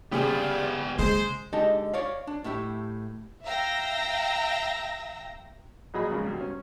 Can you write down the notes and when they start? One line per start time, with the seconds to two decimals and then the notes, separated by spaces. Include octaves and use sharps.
0.12 C#3 F3 G3 B3 G4 G#4 D5
0.99 C#3 G#3 C5
1.53 D3 G#3 D#4 G4 D#5 A5
1.93 C#5 D5 F5
2.27 D4
2.44 A2 A3 E4 G4
3.43 E5 F5 G5 A#5 E6 A#6
5.94 A#1 F#3 G#4 D#5 G#5 B5
6.11 G#2 C#3 G#3
6.25 G2 B2
6.41 C#4